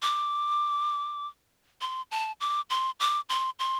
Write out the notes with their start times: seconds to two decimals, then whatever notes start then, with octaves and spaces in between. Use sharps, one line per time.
0.02 D6
1.81 C6
2.11 A5
2.40 D6
2.70 C6
3.00 D6
3.29 C6
3.59 C6